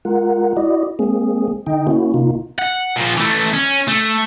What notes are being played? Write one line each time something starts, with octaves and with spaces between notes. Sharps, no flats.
G#3 F4 A#4 F#5
E4 F#4 D5 D#5
G#3 A#3 C4 G#4
D3 D#4 D#5 G5
A#3 C#4 E4 F#4
C3 A#3 D#4 F4
F#5
A#2 F3
E3 A3
C#4
A3